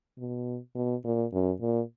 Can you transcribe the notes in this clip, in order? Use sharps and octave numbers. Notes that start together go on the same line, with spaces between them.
B2
B2
A#2
F#2
A#2